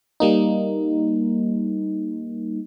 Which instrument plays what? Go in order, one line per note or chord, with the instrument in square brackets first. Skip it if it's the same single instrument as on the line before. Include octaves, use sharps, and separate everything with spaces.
[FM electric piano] G3 A#3 D#4